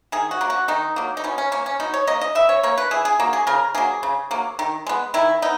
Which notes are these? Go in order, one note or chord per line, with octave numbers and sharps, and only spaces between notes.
D#3 G#4
F#4
F#3 A#3
F#4
D#3 D#4
F#3 A#3
D#4
B2 C#4
C#4
A#3 C#4
C#4
B2 D#4
C#5
A#3 D#5
D#5
E3 E5
C#5
A#3 C#5
B4
E3 G#4
G#4
A#3 F#4
G#4
C#3 A#4
F#3 A#3 G#4
C#3
F#3 A#3
D#3
G#3 B3
D#3 E4
B3 D#4